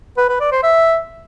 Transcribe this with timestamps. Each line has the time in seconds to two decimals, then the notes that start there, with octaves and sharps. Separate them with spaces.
0.17 B4
0.29 B4
0.40 D5
0.52 C5
0.63 E5